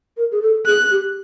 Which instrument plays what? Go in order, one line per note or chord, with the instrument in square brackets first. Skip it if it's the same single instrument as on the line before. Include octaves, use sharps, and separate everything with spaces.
[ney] A#4
G#4
A4
[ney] G#4 [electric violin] F#6
[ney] G4